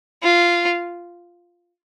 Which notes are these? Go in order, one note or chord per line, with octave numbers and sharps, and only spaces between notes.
F4